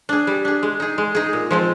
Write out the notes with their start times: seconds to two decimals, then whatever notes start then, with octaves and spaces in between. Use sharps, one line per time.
0.09 D4 G#4
0.27 G3
0.45 D4 G#4
0.63 G#3
0.80 D#4 G#4
0.98 G#3
1.15 D#4 G#4
1.33 A#2
1.51 F3 G#3 C4